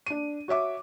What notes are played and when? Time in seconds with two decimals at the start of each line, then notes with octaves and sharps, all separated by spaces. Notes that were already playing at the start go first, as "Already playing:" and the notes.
0.06 D4 D#7
0.48 F#4 C#5 E5 D6